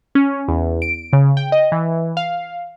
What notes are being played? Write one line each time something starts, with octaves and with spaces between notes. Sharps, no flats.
C#4
E2
D7
C#3
G5
D#5
E3
F5